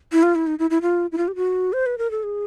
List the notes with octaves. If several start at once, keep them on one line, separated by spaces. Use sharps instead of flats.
E4
F4
E4
D#4
E4
E4
F4
E4
F4
G4
F#4
C5
B4
A#4
A4
G#4